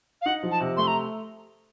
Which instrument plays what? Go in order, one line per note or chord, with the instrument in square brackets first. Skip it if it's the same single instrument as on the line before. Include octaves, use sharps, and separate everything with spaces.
[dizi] F5
[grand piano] D#4 [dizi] F#5
[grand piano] F3
[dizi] A5
[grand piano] C3
[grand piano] A3 [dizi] C6
[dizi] A#5